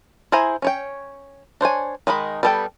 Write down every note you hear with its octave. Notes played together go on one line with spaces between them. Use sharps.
E4 G#4 C5 G#5 A#5
C#4 C#5 G5
D4 C5 C#5 G#5
D#3 G#3 D#4 B5
G3 B3 A4 F5 G5